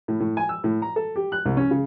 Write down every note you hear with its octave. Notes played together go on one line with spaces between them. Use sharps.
A2
A2
G#5
E6
A2
A#5
A4
G4
F#6
C2
C#4
C#3